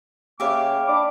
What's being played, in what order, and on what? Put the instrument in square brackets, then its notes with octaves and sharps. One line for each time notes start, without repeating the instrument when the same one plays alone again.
[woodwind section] C#3 A#3 D6 [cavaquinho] G4 E5 F5
[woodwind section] D4 B5 D6